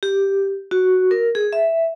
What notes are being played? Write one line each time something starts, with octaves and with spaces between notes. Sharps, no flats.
G4
F#4
A#4
G#4
E5